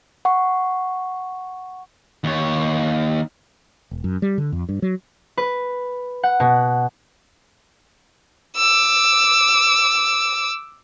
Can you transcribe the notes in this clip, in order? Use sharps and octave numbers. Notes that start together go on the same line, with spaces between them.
F#5 C#6
D#2 C#5
E1
F#2
G3
D3
F2
G2
F#3
B4
F#5
B2
D6 E6